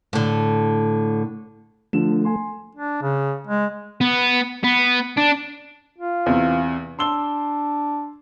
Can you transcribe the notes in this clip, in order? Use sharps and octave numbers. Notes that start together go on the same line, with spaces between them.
A2 D3
D3 F3 A3 E7
G#5 C6
D4
C#3
G#3
B3
B3
D4
F4
E2 C3
D4 C6 E6 G7